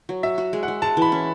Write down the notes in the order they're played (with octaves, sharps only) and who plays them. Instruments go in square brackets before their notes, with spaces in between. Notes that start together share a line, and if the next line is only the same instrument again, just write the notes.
[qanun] F#3
[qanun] F#4 [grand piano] E5
[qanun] F#4
G#3
[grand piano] F#5
[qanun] G#3
[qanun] G#3 [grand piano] A5
[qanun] E3 [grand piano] B5
[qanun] C#4